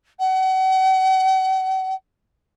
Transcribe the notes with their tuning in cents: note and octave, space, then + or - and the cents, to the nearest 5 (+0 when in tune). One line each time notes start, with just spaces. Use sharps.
F#5 +40